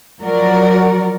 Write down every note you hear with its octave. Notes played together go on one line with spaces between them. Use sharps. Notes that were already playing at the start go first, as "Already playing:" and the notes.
F3 F#3 F#4 A#4 D5